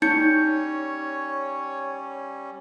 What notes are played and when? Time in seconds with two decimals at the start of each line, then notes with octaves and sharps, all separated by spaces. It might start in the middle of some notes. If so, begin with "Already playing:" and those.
0.02 G3 C#4 D#4 C#5 G6 C#7